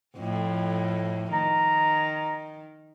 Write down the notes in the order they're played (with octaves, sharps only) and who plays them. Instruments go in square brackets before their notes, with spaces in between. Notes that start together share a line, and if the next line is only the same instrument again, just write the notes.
[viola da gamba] F2 A2
[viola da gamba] D#3 [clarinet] A#5